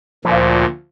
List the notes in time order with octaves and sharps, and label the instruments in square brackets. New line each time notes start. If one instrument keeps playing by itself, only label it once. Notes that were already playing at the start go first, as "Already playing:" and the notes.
[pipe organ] D2 A#2 [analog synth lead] F3